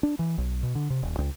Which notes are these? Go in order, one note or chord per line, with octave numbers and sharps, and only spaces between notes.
D4
E3
B1
B2
D3
C3
D#1
C#2